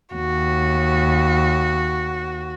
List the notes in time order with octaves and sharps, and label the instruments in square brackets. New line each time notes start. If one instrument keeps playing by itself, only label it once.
[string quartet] D#2 [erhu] F#4